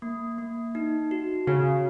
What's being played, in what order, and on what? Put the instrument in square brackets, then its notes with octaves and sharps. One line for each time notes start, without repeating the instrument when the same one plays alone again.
[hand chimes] A#3
A#3
D#4
F#4
[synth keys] C#3 [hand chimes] F#4